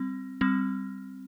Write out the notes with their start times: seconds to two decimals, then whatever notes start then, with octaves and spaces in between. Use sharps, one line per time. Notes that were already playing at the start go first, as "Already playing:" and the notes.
Already playing: G3 C4
0.41 G3 C4